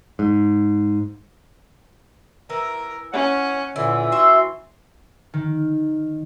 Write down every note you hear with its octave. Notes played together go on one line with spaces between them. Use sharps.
G#2
E3 A#4
C#4 C#5 F#5
A#2 D3 E3 E4
E4 F#4 E5 C6
D#3